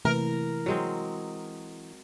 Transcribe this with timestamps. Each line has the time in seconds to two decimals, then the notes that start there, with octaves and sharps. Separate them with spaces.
0.05 C3 E3 A3 A#3 A#4
0.66 F#3 G#3 C4